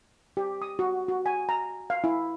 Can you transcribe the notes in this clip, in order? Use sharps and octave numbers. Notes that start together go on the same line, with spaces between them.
G4
D#6
F#4
F#4
G#5
A#5
F5
E4